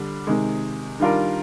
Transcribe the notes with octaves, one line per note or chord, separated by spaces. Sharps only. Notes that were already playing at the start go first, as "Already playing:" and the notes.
Already playing: D3 G3 D4
C3 D#3 G#3
D#3 G3 D4 F4 A#4